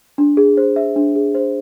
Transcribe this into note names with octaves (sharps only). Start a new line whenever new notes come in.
D4
G#4
C5
E5
D4
G#4
C5